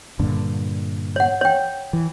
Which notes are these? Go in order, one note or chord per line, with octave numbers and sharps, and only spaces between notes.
G2 A#2 D3
C#5 F#5
C#5 G5
E3